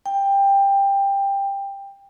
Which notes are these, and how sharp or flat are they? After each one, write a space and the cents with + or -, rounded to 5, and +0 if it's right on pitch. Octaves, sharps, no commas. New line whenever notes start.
G5 +15